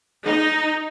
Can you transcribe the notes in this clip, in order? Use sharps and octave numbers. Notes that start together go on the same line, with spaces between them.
D#4